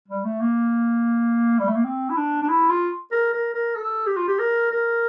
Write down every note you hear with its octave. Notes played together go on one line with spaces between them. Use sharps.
G3
A3
A#3
G3
A3
A#3
C4
E4
D4
D4
E4
F4
A#4
A#4
A#4
A4
G4
F4
G4
A#4
A#4